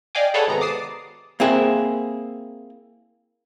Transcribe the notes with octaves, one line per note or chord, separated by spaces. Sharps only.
D5 D#5 F5 G5 G#5 D6
G#4 A4 B4 C#5 D5 F#5
G#1 C3 B3 A#5
D6 D#6 A6 C7 D7 E7
A#3 C4 E4 G#4